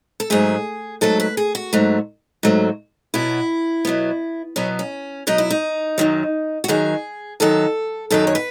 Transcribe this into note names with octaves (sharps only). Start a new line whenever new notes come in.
A4
G#2 F#3 A3 G#4
G#2 F#3 A3 A4
B4
G#4
F#4
G#2 F#3 A3
G#2 F#3 A3
B2 F#3 B3 E4
B2 F#3 B3
B2 F#3 B3 C#4
C#4
B2 F#3 B3 D#4
E4
D#4
F#2 D#3 F#3
F#4
F#2 D#3 F#3 G#4
F#2 D#3 F#3 A4
F#2 D#3 F#3 A4
C#5
B4